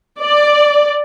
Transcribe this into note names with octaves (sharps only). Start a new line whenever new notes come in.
D5